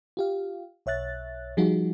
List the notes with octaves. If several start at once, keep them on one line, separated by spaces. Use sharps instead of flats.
F4 G4 F5
B1 C#5 E5 F#6 A6
F3 G3 D#4 F4 F#4 G#4